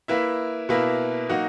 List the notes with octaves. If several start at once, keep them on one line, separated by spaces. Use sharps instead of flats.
A#3 E4 B4 E5
B2 A#3 E4 B4 E5
F#3 A#3 D#4 F#4